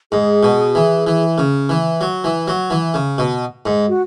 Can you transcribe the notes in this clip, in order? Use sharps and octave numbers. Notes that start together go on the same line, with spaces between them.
G#2 G#4
B2
E3
E3
C#3
E3
F#3
E3
F#3
E3
C#3
B2
G#2
F#4